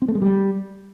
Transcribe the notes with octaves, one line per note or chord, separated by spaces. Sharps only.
C4
A3
G#3
G3